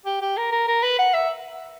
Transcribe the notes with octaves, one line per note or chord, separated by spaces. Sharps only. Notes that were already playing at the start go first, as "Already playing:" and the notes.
G4
G4
A#4
A#4
A#4
B4
F#5
E5